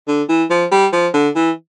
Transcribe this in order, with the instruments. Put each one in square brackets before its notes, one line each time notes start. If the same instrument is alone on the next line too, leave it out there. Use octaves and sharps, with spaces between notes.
[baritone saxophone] D3
E3
F3
G3
F3
D3
E3